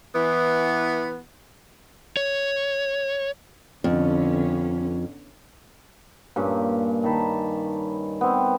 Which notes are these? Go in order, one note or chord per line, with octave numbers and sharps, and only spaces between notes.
E3 B3
C#5
F2 D3 B3 C#4
G2 A#2 C#4
D#3 A5 B5
B3 C4